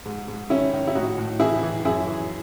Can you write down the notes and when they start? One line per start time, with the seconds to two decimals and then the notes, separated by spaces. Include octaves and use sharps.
0.06 G#2
0.28 G#2
0.50 D#3 C#4 E4
0.73 D#3
0.87 E4
0.95 A2 D#4 F#4
1.18 A2
1.40 E3 E4 G#4
1.63 E3
1.85 F#2 E4 G#4
2.07 E3